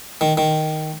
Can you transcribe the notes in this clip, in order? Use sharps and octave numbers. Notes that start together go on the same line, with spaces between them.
D#3
D#3